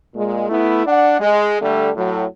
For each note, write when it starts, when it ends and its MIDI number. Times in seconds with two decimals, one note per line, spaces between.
0.16 0.47 46
0.16 0.47 56
0.49 0.86 57
0.49 0.86 59
0.49 0.86 64
0.86 1.20 62
0.86 1.20 74
0.86 1.20 78
1.20 1.61 56
1.62 1.91 50
1.62 1.91 55
1.62 1.91 57
1.96 2.26 45
1.96 2.26 54